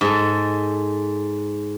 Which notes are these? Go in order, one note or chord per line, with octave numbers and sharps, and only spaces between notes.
G#2 A4